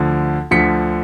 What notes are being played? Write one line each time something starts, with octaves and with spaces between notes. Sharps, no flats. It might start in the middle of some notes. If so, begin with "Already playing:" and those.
Already playing: D2 D3 F3
D2 D3 F3 B6 C#7